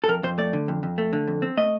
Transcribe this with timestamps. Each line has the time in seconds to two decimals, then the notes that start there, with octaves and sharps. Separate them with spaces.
0.04 A4
0.08 F2 A#4
0.23 F2 C5
0.38 A3 D5
0.53 D3
0.68 F2
0.83 F2
0.98 A3
1.13 D3
1.27 F2
1.42 C4
1.57 A3 D#5